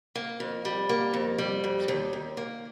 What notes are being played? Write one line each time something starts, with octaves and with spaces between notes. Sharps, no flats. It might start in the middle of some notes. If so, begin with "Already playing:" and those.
A#3
F2
G3
A#3
F2
G3
F2
D#2
D#2
A#3